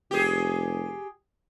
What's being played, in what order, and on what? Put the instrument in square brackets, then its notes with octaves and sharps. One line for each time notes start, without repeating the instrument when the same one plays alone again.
[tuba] F1 [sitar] G4 G#4